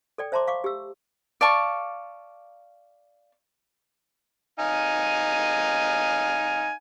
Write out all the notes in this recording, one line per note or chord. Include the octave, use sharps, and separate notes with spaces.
A4 D5 G5
C5 E5 A5 A#5 C6 D6
F5 C#6 D6
G4 E6
D5 F5 A5 C#6
D#4 F5 G#5